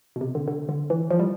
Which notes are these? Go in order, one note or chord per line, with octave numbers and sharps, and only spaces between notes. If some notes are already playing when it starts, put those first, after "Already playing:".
B2
C3
D3
D3
D3
E3
F3
G3